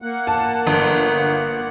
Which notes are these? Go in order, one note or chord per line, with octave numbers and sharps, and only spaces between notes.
A#3 F#5
A5
G1